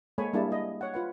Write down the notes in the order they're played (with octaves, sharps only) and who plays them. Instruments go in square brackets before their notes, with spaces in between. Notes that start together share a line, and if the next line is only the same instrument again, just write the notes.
[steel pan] G#3 A#3 A4 C#5 G#5 B5
G3 A#3 D4 E4 G#4 A5
E4 D#5
C#5 F#5
F4 B4 F#5